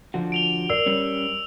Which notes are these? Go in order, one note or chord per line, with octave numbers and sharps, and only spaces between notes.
D3 F3 F#4
D7 F7 G7
A#4 D5 E6 C7
G3 C#4